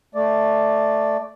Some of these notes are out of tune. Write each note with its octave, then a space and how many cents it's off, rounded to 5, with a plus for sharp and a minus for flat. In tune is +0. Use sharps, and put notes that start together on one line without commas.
A3 +0 D5 +0